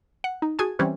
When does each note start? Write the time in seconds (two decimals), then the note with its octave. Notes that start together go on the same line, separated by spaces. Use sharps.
0.24 F#5
0.42 D#4
0.59 F#4 G#4 G#5 A5
0.79 E3 G3 C4 C#4 G4 B4